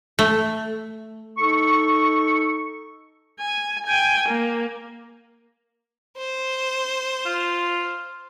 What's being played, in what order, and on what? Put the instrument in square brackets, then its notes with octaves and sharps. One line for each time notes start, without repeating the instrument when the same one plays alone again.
[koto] A3
[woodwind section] D#4 A4 C#6
[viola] G#5
G5 G#5
A#3
[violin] C5
[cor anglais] F4